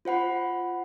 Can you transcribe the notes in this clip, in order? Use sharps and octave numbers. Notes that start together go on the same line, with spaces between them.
F4 C5 F#5 B5